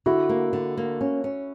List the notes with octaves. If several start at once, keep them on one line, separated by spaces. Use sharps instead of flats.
D3 E4 F#4
A#3
D3
A#3
C#4
C#4